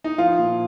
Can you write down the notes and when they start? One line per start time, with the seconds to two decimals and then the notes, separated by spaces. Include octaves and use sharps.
0.04 D#4
0.18 F3 F4
0.39 A#2